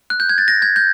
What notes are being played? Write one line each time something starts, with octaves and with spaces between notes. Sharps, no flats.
F#6
G6
G#6
A6
A#6
G#6
G6